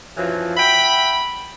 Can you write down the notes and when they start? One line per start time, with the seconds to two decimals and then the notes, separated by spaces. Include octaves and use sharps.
0.17 F#2 E3 F3
0.57 E5 F#5 G5 B5